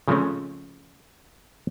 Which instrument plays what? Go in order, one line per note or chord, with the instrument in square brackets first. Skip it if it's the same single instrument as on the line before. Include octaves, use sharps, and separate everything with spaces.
[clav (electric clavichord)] C#3 F3 G#3 A3 C4 C#4